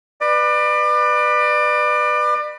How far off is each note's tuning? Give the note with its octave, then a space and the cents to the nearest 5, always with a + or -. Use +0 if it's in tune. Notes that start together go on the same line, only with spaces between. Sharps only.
B4 +0 D5 +30